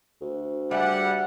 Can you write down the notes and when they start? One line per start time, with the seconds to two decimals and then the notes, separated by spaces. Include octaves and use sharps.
0.21 D2
0.71 G3 G4 G#4 E5 F#5